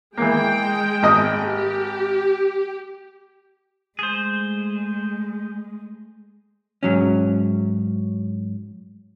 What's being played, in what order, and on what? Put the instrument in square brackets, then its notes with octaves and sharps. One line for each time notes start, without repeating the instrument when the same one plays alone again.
[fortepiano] E3 A#3 [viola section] G#3 G5
[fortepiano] G#1 D#5 D#6
[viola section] G4
[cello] G#3 A3 [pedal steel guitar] G#4 C5
[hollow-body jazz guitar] G#2 F#3 C#4